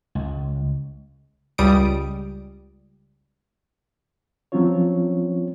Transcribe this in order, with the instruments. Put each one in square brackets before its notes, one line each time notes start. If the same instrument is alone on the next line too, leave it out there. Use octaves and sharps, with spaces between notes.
[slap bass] C#2
[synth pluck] C#2 G3 D#6 D7
[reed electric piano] F3 F#3 C4 C#4 F4 C#5